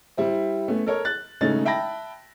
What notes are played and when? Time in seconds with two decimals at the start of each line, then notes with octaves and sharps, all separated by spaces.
0.17 G3 E4 C5
0.68 A3 B3 C#4
0.86 A4 A#4 C#5
1.05 F#6 A6
1.41 E1 C#3 A3 D#4 A6
1.65 E5 G5 A5 B5 A#6